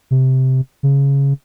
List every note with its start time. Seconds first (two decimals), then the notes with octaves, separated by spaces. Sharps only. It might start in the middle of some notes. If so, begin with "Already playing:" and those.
0.11 C3
0.83 C#3